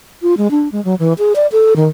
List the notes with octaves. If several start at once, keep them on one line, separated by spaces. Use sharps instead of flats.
F4
G#3
D4
G#3
F#3
E3
G#4
D5
A4
D#3